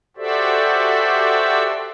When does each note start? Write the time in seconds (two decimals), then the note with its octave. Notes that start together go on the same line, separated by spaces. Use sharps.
0.17 F#4 G4 A4 C5 D5 E5